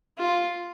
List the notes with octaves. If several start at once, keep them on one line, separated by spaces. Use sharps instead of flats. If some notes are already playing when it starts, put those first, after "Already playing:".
F4